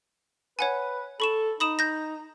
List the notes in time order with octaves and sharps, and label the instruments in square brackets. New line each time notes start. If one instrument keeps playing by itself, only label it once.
[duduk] B4 [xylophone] C#5 F#5 G#5
[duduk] A4 [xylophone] B5 C#6 E7
[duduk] D#4 [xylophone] B5 D#6 E7
[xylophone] G6 A#6